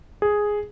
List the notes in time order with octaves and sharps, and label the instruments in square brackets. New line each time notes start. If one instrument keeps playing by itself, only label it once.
[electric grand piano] G#4